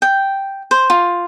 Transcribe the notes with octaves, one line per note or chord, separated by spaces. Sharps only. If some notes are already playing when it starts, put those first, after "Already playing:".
G5
C5
F4